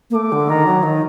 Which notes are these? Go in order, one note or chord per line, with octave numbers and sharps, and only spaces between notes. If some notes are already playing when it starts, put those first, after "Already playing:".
A#3
A3 D6
D3
D#3 A#5
F#3
D#3